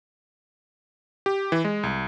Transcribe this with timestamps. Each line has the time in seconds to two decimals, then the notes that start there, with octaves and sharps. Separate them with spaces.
1.26 G4
1.52 E3
1.64 G#3
1.83 C2